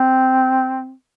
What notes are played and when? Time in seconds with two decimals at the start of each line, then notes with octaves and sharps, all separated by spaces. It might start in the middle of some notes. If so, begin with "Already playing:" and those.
Already playing: C4